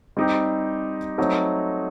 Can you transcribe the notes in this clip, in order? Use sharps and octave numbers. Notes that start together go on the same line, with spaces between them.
G3 C4 D#4 G4
F#3 A3 C4 D#4